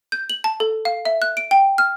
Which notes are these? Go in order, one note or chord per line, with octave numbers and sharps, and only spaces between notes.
G6
F#7
A5
A4
F5
E5
F#6
D7
G5
F6